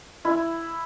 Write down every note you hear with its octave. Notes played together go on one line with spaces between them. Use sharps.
E4